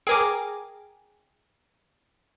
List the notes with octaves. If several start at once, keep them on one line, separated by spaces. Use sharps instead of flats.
G#4 A#4 G5 G#5 D6